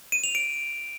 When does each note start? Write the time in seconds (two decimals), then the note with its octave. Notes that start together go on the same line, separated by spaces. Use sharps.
0.12 D#7
0.24 F7
0.35 D7